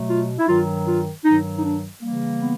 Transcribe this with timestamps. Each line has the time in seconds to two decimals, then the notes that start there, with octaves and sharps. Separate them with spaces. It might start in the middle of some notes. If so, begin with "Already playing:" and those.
Already playing: B2 F#3 A3
0.09 F4
0.39 E4
0.48 G2 D#3 F#3 F4
0.87 F4
1.25 G2 D#3 F#3 D#4
1.56 D#4
1.64 D4
2.02 C#3 E3 G3 A#3
2.40 B3